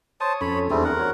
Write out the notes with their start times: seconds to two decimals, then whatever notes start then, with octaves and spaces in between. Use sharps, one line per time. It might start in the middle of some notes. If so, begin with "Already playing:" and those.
0.21 C5 C#5 A5 D#6
0.41 F2 C#4 A4 C#5 B5
0.70 E2 G3 A3 C4 D4 G#4
0.85 A#4 F#5
0.99 F#4 C#5